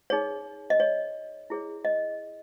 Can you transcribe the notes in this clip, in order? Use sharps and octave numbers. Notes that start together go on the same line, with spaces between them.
D#4 G#4 C#5
D#5
C#5
E4 G#4 C#5
D#5